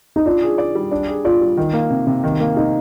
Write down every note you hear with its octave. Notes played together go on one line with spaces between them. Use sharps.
D#4
D4 F4
G#4
D5
G3
D4
G#4
F4 D5
G3
D#3
A#3
C3
C3
D#3
A#3
C3 D#4